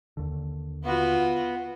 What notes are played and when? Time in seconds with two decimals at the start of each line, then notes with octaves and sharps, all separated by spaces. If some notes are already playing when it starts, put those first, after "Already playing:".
0.17 D#2 D3
0.84 B3 F4 F#4